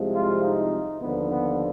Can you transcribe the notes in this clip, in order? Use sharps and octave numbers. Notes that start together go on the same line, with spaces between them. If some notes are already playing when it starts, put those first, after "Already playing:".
Already playing: C2 C3 F3 G#3
F4
D#4
D#2 D3 F3 B3
B3